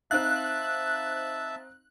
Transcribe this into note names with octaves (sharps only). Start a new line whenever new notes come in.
C4 D#4 E5 F5 A5 F#6